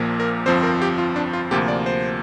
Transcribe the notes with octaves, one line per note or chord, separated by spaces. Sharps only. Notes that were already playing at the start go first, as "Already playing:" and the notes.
Already playing: A#1 A#2 F3 A#3
A#4
G1 F2 F3 C4 C5
A#4
G4
F4
D4
F4
D2 C3 F3 A#3 G4
D5
C5